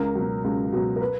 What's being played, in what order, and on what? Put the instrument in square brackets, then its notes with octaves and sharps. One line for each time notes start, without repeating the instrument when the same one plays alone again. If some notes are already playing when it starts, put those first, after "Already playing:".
Already playing: [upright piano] C#2 A#4
B2 F#3
C#2
B2 F#3
A#4
B4